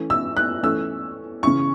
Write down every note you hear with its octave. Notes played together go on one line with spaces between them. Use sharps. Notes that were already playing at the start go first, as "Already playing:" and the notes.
Already playing: E3 A3 C#4
E6
F#6
E3 A3 C#4 E6
C#3 E3 C#4 C#6